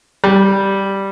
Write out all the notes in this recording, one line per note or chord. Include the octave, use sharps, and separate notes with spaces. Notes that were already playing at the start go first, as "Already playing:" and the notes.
G3